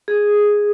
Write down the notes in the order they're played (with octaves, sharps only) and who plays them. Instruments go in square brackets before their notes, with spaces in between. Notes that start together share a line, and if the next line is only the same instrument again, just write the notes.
[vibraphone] G#4